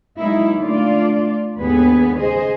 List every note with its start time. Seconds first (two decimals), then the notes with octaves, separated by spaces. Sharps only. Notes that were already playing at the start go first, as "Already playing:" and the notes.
0.18 F#3 G#3 A#3 D#4 E4
0.59 D3 A3 D4 F4 D5
1.58 D#2 G#2 D3 B3 G#4 B4
2.18 C#3 G#4 C5 D#5